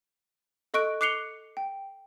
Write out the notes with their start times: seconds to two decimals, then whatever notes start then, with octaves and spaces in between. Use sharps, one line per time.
0.74 A4 D#5 C#6 F#6 D7
1.01 D6 F#6 C7 C#7 F7 G7
1.57 G5